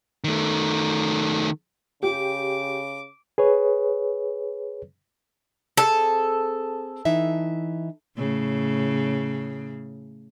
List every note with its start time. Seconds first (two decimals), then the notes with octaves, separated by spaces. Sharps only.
0.24 D#3 A3
2.03 C#3 G4 D6
3.38 G#4 B4 C#5
5.77 C4 G#4 A4 C5
7.05 E3 D#4 E5
8.17 A2 C#3